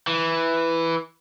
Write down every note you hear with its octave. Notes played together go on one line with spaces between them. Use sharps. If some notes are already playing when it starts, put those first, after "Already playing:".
E3